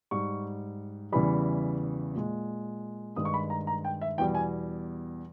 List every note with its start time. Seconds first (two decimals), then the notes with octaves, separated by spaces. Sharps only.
0.11 G#2 G3 C#6
1.12 E2 C#3 E3 G3 B5
2.15 A#2 G#3
3.16 G2 D#3 G#3 D#6
3.25 C#6
3.34 B5
3.50 A#5
3.67 A#5
3.85 G5
4.01 E5
4.18 E2 B2 G3 G5
4.35 G#5